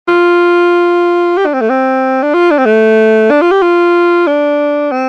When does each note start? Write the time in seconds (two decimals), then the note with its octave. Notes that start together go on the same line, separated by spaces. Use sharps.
0.08 F4
1.38 G4
1.46 D4
1.54 C4
1.61 A3
1.70 C4
2.23 D4
2.34 F4
2.51 D4
2.58 C4
2.65 A3
3.30 D4
3.41 F4
3.52 G4
3.62 F4
4.27 D4
4.91 C4